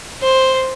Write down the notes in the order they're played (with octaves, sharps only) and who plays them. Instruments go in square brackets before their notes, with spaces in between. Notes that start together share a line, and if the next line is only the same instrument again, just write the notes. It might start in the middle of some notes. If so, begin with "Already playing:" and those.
[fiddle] C5